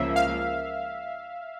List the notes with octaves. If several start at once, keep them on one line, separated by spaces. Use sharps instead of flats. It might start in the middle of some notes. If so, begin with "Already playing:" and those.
Already playing: C#2 C#3 F3 A#3 E5
F5